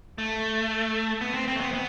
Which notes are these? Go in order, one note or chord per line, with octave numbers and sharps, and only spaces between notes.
A3
B3
C4
C4
A3
B3
B3